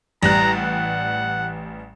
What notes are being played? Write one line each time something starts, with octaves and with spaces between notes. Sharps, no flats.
A1 G3 A#5 F#6
F#5